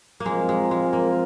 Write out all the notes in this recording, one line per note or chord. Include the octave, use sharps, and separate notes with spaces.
A#3
F3 G#3 C4 F4 A#4
G#3
G#3
A#3